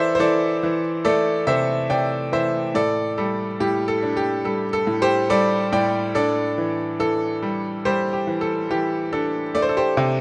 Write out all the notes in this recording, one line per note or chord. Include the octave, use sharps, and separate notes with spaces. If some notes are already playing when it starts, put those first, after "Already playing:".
Already playing: E3 E4 A4 C5 D5 E5
C5
E3 A4 D5
E3
A3 A4 D5
C3 C5 E5
C3 D5 G5
E3 C5 E5
A2 A4 D5
G3 A4
A2 G4
A4
D4
G4
G3 A4
A4
A2
G4 C5
G3 A4 D5
A2 D5 G5
D4 A4 D5
E3
E3 A4
G3
G3 G4 C5
G4
E3
A4
E3 G4
D4 A4
A3 D5
C5
A4
G4 C5
C3